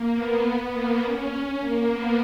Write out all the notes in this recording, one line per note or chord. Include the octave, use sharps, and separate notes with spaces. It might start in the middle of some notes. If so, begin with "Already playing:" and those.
Already playing: A#3
B3
A#3
C#4
C#4
A#3
B3